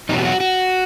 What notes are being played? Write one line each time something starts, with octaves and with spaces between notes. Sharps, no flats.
E2 B2 F#3 D#4
G4
F#4
F#4